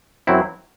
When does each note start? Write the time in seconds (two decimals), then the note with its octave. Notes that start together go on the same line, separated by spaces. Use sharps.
0.27 F#2 F#3 C4 E4